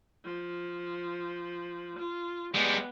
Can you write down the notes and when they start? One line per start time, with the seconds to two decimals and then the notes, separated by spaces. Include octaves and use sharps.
0.24 F3
1.99 F4
2.54 G3 G#3 B3